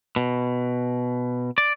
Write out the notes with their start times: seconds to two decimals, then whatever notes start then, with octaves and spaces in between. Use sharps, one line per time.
0.16 B2
1.58 D5